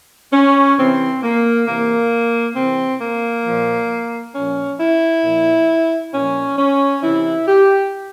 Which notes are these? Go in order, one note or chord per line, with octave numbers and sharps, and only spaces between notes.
C#4
C3 E3 C4
A#3
C3 E3 A#3
C3 E3 C4
A#3
A#2 F3
A#2 F3 C#4
E4
A#2 F3
A#2 F3 C#4
C#4
C3 E3 E4
G4